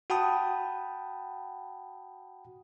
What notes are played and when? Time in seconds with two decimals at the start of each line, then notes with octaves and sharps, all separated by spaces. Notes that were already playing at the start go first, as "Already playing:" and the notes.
0.10 F#4 F#5 G5 A5 B5 D#6